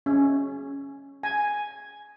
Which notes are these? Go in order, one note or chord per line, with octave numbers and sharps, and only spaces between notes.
C#4
G#5